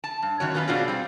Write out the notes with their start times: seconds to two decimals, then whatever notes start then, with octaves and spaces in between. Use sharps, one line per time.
0.04 A5
0.22 G2
0.40 F#2 D#3 F#4 C#5
0.54 B3 C#4 F4 G4 B4
0.67 B2 C4 D4 F4 F#4 G#4
0.88 G3 C4